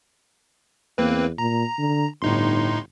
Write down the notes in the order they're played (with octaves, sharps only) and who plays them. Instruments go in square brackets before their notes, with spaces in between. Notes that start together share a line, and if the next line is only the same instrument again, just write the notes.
[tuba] E2 [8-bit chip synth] A#3 C4 B4
[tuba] A#2 [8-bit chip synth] A#5
[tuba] D3
[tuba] G1 [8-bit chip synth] A2 D#4 C6